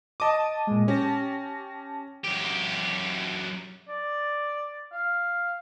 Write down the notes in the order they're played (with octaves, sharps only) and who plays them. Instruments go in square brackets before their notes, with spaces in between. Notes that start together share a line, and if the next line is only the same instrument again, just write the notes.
[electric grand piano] D#5 D6 [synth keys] A5 D#7
[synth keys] A#2 G#3
[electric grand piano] C#4 [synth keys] G4 A5 A#6
[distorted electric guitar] F#2 G4
[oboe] D5
F5